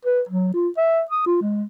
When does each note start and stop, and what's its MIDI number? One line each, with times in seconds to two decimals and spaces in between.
0.05 0.21 71
0.29 0.51 54
0.54 0.68 65
0.77 1.02 76
1.10 1.23 87
1.26 1.38 65
1.42 1.63 56